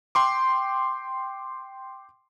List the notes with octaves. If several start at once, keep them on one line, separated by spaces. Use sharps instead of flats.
G5 C6 D6